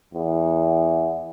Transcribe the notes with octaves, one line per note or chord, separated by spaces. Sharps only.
E2